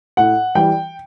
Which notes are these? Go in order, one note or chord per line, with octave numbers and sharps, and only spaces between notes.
A2 F#5
E3 G3 G5